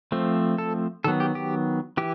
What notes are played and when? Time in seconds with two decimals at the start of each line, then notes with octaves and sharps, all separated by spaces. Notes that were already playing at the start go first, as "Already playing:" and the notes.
0.12 F3 A3 C4
0.58 A4
1.04 D#3 F#3 B3 A4
1.20 G4
1.35 G4
1.97 E3 G4